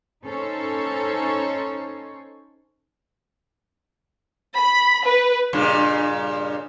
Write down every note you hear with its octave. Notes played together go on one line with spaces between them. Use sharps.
C#4 D#4 A4 C5 C#5
B5
B4
G2 A#2 C#3